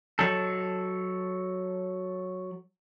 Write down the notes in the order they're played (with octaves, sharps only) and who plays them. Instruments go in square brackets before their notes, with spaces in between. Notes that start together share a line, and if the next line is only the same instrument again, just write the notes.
[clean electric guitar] F#3 A4